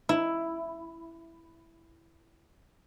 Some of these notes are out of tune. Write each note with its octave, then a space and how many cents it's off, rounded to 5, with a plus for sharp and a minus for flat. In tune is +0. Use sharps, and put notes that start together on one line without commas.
E4 +5